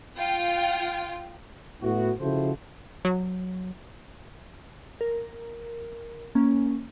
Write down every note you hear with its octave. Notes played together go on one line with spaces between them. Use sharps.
F4 G5
A2 B3 E4 F#4
C#3 F3 E4 F#4 A4 C5
F#3
A#4
A#3 C#4